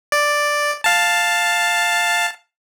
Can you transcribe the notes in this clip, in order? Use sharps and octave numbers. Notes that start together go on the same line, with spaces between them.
D5
F5 A5